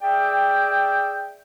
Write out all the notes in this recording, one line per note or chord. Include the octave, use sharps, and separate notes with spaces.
G#4 D5 E5 G5